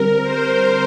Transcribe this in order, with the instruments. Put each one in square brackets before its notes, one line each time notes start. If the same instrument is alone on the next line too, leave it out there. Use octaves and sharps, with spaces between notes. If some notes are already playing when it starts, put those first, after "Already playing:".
Already playing: [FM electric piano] D3 G3 C4 [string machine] A#4
[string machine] C5